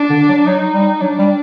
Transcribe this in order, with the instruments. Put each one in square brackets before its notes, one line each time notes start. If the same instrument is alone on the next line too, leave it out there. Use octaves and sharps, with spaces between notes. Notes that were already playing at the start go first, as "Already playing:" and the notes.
Already playing: [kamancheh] D4
[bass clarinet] D3
F#3
[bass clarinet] F#3 [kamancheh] D#4
[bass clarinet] G3
[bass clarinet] F#3 [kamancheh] D4
[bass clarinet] G3